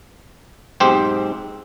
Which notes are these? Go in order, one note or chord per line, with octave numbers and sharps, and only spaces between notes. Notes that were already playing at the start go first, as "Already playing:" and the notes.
B1 G#2 C4 G4 C5